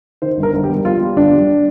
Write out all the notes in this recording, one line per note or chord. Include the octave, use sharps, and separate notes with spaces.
D#3 C5
G1
A#4
G1
G4
G3
G3 F4
G3
G1 D4
G3